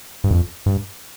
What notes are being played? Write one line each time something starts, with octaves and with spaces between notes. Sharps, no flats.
G2
F2
G2